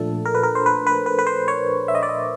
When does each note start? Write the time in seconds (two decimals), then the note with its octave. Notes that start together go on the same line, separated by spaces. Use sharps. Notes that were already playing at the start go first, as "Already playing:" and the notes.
Already playing: A#2 F3 A3 D4 A4
0.25 A#4
0.35 B4
0.43 A#4
0.55 C5
0.66 B4
0.87 B4
1.06 B4
1.19 B4
1.27 C5
1.48 C#5
1.88 E5
1.95 D#5
2.03 D5
2.09 D#5